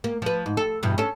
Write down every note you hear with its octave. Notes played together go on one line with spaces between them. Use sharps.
A#3
F3 B4
G#2
A4
E2 G2 B2
C#4 A4